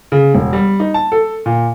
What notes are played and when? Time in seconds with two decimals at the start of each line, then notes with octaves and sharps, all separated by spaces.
0.12 C#3
0.34 E1
0.53 G3
0.80 D#4
0.94 A5
1.12 A4
1.46 A#2